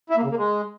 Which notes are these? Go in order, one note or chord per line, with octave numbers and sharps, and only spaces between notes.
E4
A#3
C#3
A#3
G#3